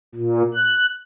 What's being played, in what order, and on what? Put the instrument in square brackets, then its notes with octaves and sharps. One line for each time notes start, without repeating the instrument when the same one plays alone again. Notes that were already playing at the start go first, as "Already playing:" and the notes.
[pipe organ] A#2
F#6